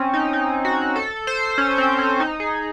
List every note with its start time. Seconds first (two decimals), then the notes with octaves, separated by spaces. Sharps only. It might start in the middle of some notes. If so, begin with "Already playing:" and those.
Already playing: C4 C#4
0.14 D#4
0.33 D#4
0.65 F#4
0.96 A4
1.27 C5
1.58 C#4
1.78 C4
1.99 C#4
2.20 D#4
2.40 G#4